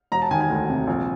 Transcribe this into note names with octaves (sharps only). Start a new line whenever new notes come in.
E1 A#5
A5
D#3 G#5
G#5
D2
C3
A#1